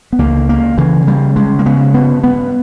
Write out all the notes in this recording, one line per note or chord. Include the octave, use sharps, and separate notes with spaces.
B3
C#2 A#3
C#3 A#3
C#3 E3
C#3 G3
C#3 G#3
A#3
C#3 B3
G2 B3
G2 B3